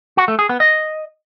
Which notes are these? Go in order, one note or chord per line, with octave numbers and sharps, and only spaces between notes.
F#4
A3
G#4
B3
D#5